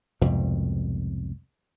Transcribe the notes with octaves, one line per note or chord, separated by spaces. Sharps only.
C2 F2 G#2 B2